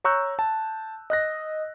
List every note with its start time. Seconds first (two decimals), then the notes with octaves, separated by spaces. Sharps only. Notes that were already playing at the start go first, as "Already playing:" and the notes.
0.04 C#5 A#5 C#6 E6 F#6 G6
0.39 A5
1.10 D#5 F#6 A#6